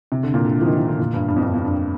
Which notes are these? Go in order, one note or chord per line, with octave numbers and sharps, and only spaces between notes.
C3
D3
A#2
D3
F3
D#3
F3
D3
A#2
G2
G2
F2
G2
F2
G2